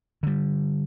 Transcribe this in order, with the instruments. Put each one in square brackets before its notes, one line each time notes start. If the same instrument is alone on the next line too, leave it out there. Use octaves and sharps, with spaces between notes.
[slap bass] D3 G3